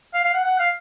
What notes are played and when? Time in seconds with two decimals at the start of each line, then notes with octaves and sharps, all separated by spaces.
0.14 F5
0.24 F5
0.34 F#5
0.44 F#5
0.59 F5